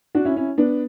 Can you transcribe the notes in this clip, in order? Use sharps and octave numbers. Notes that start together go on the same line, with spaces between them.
D4 F#4
C#4 E4
C#4 E4
B3 D4